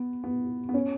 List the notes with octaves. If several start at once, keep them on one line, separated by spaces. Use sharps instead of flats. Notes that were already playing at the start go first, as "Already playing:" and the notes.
Already playing: B3
B3
B3
C#4